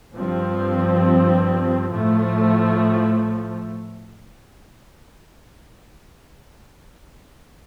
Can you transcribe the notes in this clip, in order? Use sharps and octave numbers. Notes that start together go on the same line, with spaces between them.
G2 F3 C4
A2 F3 A3